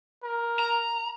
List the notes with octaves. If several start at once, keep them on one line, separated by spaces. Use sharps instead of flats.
A#4
A#5